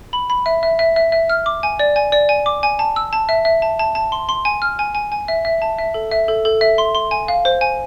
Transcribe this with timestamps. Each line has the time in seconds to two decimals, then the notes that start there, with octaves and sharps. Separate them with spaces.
0.13 B5
0.30 B5
0.46 E5
0.63 E5
0.79 E5
0.96 E5
1.12 E5
1.29 F6
1.46 D6
1.63 G#5
1.79 D5
1.96 G#5
2.12 D5
2.29 G#5
2.46 D6
2.63 G#5
2.79 A5
2.96 E6
3.13 A5
3.29 E5
3.45 E5
3.62 A5
3.79 A5
3.95 A5
4.12 C6
4.29 C6
4.45 G#5
4.62 F6
4.79 G#5
4.95 G#5
5.12 G#5
5.28 E5
5.45 E5
5.62 A5
5.78 E5
5.94 A4
6.11 E5
6.28 A4
6.45 A4
6.61 E5
6.78 C6
6.95 C6
7.11 G#5
7.28 F5
7.45 C5
7.61 G#5